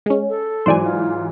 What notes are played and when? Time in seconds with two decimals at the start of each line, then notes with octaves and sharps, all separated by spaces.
0.06 G#3 C#4
0.29 A4
0.66 G#2 E3 F#3 C5 D5 G#5
0.83 F4